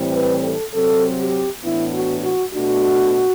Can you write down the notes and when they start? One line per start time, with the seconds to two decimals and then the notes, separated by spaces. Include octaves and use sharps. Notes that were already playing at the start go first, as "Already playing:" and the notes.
Already playing: A2 E3 G3 C4
0.13 B4
0.43 A4
0.74 C3 F#3 C4 A4
1.19 G4
1.63 A2 E3 B3 D4 E4
1.94 F#4
2.23 F#4
2.54 B2 A3 D4 F#4